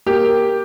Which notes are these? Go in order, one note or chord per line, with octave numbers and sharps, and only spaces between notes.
A#3 G4